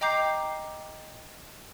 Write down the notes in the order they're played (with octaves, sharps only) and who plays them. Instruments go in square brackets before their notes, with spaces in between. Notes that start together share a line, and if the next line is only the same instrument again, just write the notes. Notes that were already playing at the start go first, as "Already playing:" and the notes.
[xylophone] D#5 G5 A#5 D6 G6 C7